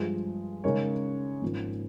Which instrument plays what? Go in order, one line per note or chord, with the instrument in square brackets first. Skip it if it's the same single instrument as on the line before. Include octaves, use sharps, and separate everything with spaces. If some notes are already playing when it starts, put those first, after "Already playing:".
Already playing: [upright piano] G2 F3 G#3
C#3 G#3 D#4 A#4 C#5
G#1 G#2 F3 A#3 C#4